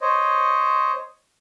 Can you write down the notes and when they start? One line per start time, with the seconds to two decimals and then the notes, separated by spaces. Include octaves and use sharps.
0.01 C5 C#5 D#5